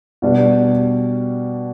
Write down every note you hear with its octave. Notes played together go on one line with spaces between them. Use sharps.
B2 G3 D4